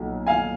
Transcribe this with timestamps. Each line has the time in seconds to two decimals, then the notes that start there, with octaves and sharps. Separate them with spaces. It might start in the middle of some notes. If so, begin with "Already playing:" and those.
Already playing: B1 A#2 F#3
0.27 F5 G#5